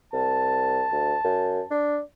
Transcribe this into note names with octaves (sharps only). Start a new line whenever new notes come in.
C2 A5
D2
F#2
D4